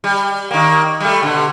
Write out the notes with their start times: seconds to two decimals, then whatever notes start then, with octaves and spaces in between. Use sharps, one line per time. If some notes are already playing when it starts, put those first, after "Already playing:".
0.04 G3
0.51 D#3 A#3
1.00 G3 A3
1.23 B2 D3